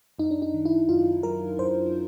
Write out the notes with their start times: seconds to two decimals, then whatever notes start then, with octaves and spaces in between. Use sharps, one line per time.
0.19 F#2 D#4
0.31 D4
0.42 D#4
0.54 D#3
0.65 E4
0.89 F#2 F4
1.23 F#3 A#4
1.59 F#2 C5